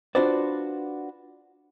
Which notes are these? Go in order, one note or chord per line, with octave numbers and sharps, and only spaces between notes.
D4 F4 F#4 B4 C5 D5